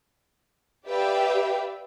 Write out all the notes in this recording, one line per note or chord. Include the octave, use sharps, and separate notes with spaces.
G4 B4 D5 E5 F5 G5